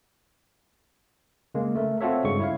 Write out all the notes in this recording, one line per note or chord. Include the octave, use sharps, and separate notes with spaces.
C#3 G#3 A#3
A3 A#4
C4 F4 F#4 A4 C#5 E5
G2 C#3 G#3 C#6
E4 C#5 F5